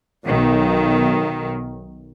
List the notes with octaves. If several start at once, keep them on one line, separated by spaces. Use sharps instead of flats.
B1 D#3